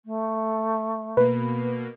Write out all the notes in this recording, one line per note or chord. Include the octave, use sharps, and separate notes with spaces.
A3
B2 A#3 B4